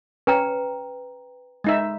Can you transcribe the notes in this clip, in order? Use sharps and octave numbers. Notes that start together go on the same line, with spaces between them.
C#4 B4 G5 A#5
G#3 D#4 E5